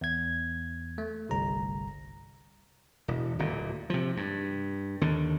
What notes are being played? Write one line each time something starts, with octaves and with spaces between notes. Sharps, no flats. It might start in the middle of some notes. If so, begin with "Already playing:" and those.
E2 G#6
A3
G1 C2 A#5
E1
D1 A#2
C3 F3
G2
D#2 D3